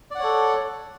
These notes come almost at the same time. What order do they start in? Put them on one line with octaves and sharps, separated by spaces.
D5 F#5 C#5 A4